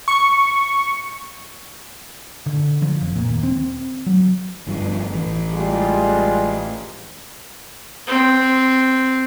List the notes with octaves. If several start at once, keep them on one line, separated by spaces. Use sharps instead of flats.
C#6
D3
F3
F1
A#2
D#2
C4
F#3
G1 G2 F3
A1 E3
G3 G#3 F4
C4